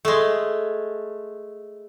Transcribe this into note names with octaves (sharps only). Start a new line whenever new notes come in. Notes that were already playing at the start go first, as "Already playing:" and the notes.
G#3 A3